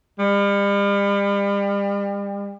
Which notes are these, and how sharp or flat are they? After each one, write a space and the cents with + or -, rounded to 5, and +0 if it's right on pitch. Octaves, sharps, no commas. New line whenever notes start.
G3 +40